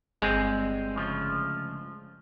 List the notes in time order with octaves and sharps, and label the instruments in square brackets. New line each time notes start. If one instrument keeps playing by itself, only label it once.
[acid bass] G1 [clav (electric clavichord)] G#3 [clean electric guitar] C4 C5 G#5
[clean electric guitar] D2 C#3 F3